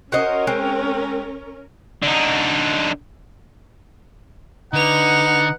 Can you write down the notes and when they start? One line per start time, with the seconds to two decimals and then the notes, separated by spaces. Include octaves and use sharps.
0.12 C#4 F#4 A#4 C5 D#5
0.47 G#3 C4
2.03 D3 D#4
4.73 D3 D#4 B4 F#5 F7